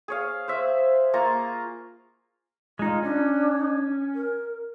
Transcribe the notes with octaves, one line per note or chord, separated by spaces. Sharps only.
G#4 C#5 F5
C5 E5
A#3 F4 A#5 C#6
G#3 D#4 F4
C#4 D4
A#4